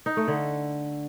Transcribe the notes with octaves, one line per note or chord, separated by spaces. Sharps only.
D#4
A3
D3